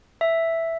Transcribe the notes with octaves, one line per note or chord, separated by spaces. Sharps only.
E5